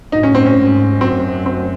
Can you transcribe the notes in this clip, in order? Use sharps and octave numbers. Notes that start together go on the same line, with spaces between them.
A2 D#4
C#4
C4
C#4
G#2
F#2 C4
C4